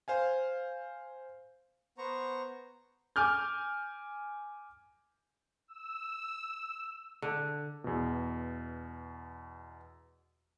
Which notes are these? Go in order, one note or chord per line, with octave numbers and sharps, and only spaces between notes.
C5 F5 G#5
B3 C5 A#5 C#6
G#5 D6 F6 G6
E6
D3
E2 B2